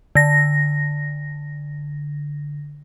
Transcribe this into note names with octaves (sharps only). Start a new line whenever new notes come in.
D3 A#6